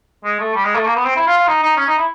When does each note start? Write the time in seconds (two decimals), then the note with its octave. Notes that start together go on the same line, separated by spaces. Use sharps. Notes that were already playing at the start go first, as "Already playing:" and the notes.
0.24 G#3
0.40 A3
0.55 G3
0.65 G#3
0.75 A3
0.85 A#3
0.95 B3
1.05 C4
1.16 E4
1.27 F4
1.37 F4
1.47 D#4
1.63 D#4
1.77 C#4
1.87 D#4
1.98 E4